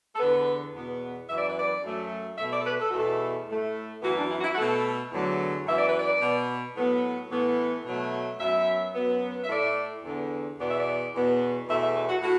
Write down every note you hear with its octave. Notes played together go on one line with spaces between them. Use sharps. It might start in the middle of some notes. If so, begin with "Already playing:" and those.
A4
E2 D3 B3 B4
E2 B2 B3
F#2 E3 B3 E5
D5
B4
D5
F#2 F#3 A3
B2 A3 E5
D5
A4
B4
A4
E2 B2 A3 F#4
A4
A2 A3
F#2 E3 B3 F#4
D4
E4
F#4
E4
F#4
B2 A3 A4
E2 D3 F#3 A3
F#2 E3 B3 E5
D5
B4
D5
B2 B3
A2 F#3 B3
A2 E3 B3
B2 F#3 A3
F#2 F#3 B3 E5
F#2 F#3 B3
E5
A2 A3 D5
E2 D3 B3
E2 B2 B3 D5
E5
D5
E2 B2 B3
E2 B2 A3 E5
E5
B4
F#4
A2 F#4